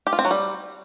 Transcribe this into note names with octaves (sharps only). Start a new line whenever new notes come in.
G4
F4
C4
F#3
G3